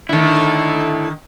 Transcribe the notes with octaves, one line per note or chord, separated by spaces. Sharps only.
D3 D#3 E4 A4